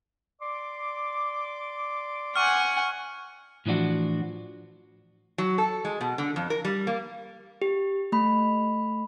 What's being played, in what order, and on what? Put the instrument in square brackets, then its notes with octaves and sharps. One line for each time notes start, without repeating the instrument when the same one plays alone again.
[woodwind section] D5 C6 D6
[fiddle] F#5 G#5 [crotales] C#6 F6
[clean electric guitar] A2 E3 F3 D4 F#4
[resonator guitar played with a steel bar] F#3
A4
G#3
B2
D3
F2
A#4
G3
A#3
[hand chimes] G4
A3 B5